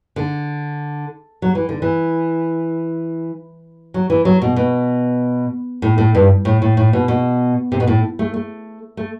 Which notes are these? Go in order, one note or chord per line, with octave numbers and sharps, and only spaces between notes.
D3
F#3
E3
D3
E3
F#3
E3
F#3
B2
B2
A2
A2
G2
A2
A2
A2
B2
B2
C3
B2
A2
A3
A3
A3